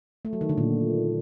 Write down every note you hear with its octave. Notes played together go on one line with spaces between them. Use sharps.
A3
F#3
D#3
D3
A#2